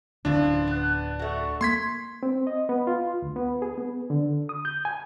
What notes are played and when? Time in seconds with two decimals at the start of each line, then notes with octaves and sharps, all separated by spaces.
0.25 D1 D3 E3 F3 C#4 D4 F4
0.68 B3
1.19 A3 F#4
1.61 A#3 C6 G#6 B6
2.23 C4
2.47 D#5
2.69 B3
2.87 F4
3.22 D2
3.36 B3
3.62 G#4
3.78 B3
4.10 D3
4.49 D#6
4.65 G6
4.85 G#5